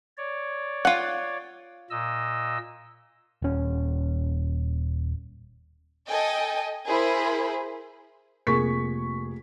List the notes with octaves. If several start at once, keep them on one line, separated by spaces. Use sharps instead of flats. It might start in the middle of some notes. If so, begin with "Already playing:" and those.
C#5 D5
F4 F#5
A#2 D#5 E6
D#1 C#4
A4 D#5 G5 G#5
E4 G#4 A#4 C5 B5
F1 A#3 G#4 C#6 B6